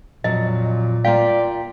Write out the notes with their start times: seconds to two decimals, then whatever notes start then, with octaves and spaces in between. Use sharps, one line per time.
0.24 F2 A#2 F#3 D#5
1.05 A#3 F4 D5 F5 G5